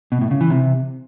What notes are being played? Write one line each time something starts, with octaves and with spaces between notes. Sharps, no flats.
B2
A2
C#3
E3
C3